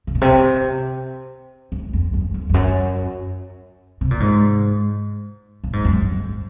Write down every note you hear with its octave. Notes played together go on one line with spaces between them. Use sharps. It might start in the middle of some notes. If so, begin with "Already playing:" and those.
C3
A#2
C3
G#2
F2
F#2
F2
F2
F#2
C3
A#2
G#2
A#2
G#2
F#2
F2